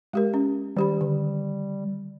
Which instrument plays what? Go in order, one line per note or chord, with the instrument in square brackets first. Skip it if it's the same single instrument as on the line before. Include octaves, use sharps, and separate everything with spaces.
[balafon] G#3 G4 A#4
C#4
[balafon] D#3 G4 B5 [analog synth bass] G3
[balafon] D3